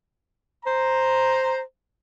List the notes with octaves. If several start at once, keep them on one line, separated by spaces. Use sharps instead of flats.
C5 A#5